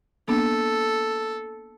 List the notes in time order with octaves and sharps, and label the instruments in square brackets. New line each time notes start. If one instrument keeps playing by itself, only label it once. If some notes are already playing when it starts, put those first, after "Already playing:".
[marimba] A#3 B3 D4 [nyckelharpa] A4